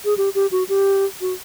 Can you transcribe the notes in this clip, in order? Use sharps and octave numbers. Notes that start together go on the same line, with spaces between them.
G#4
G4
G4
F#4
G4
F#4